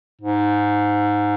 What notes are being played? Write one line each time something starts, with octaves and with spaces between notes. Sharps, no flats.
G#2